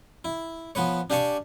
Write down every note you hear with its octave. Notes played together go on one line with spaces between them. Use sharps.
E4
F3 B3 B4 C#5
D4 G4 F5 G#5 A5 C#6